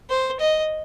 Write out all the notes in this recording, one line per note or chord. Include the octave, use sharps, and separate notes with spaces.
C5
D#5